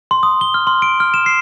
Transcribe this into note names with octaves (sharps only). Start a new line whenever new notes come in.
C6
D#6
G7
F6
C6
D7
F6
E7
C7